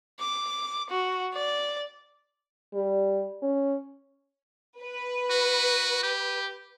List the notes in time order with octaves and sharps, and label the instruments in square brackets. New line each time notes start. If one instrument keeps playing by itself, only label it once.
[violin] D6
F#4
D5
[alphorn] G3
C#4
[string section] B4
[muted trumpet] F#4
G4